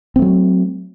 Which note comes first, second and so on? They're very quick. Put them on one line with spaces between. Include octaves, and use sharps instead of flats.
C4 A3 F#3